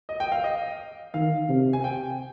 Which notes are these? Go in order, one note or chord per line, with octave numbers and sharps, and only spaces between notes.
D#5
G5
F5
D#5
D#3 F5
C3
G#5
G5